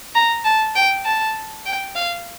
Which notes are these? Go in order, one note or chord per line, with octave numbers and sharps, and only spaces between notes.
A#5
A5
G5
A5
G5
F5